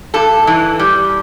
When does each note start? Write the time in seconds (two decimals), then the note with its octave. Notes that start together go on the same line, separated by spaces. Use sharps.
0.14 G2 A4
0.47 E3
0.79 G3